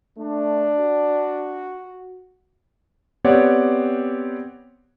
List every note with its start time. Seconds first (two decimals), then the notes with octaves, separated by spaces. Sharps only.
0.18 A3 D4
0.78 F#4
3.24 B3 C4 G4 C#5 D5 F#5